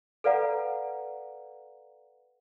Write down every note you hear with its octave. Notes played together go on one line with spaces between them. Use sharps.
A4 B4 D5 F5 F#5 A#5